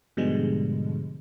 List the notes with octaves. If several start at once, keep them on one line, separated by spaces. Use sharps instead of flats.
G#2 B2 D3 F3 G3 G#3